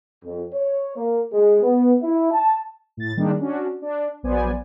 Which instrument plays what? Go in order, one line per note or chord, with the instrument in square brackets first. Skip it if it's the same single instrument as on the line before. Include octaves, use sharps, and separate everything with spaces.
[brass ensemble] F2
C#5
A#3
G#3
B3
E4
A5
[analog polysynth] A2 A6
D#3 G3 G#3 A#3 D4 D#4
C#4 D4 F#4
D4
A#1 F#3 B3 C5 D5 G#5